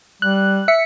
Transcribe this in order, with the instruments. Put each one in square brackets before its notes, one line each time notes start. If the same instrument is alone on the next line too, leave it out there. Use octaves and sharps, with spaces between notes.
[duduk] G3 [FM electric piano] F#6
[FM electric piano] E5 B6 C#7